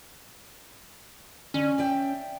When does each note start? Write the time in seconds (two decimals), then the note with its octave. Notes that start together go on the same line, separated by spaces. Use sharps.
1.54 D3 C#4
1.78 D5 E5 G5